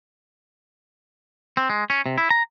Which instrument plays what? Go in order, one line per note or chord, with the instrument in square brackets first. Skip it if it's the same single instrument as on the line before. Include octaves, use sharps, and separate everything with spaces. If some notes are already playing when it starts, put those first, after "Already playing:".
[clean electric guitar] C4
G#3
C#4
C3
E4
A#5